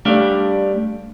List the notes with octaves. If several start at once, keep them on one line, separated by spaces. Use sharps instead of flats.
G3 A3 D4 F5